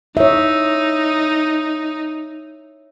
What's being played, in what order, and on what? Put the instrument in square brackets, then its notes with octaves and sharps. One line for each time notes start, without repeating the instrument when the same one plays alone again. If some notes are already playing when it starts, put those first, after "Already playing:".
[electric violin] D#4 [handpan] C#5 E5